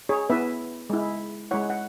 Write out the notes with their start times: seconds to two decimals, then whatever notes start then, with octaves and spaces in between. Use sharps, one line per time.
0.09 G#4 C#5
0.29 B3 E4 B4 E5
0.90 G#3 E4
1.51 G#3 E4 C#5 F#5
1.70 F#5